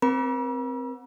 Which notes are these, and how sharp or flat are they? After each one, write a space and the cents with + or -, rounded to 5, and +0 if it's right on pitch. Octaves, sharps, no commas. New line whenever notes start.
C4 +0 A#4 +35 B5 -45